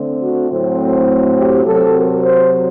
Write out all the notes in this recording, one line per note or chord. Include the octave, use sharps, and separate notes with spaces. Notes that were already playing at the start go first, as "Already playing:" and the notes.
Already playing: D3 A3 C4
F#4
A2 F#3 A3 C4
G4
C3 F#3 C4 A4
A#4
C5